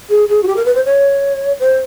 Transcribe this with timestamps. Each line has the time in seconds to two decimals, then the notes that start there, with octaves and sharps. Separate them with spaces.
0.09 G#4
0.29 G#4
0.43 F#4
0.47 G4
0.56 A#4
0.65 B4
0.75 C5
0.85 C#5
1.60 C5